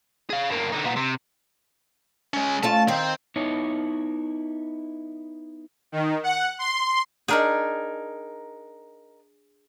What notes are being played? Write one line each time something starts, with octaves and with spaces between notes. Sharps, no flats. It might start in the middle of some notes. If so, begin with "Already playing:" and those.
G#4 F5
G2 A#3
D3 D#4
A#2 B3
C3
G#3 C#4
A3 C#4 F4 A5
D#3 C4
B3 D#4 E4 C#5
D#3
F#5
C6
D4 D#4 G#4 A#4 G5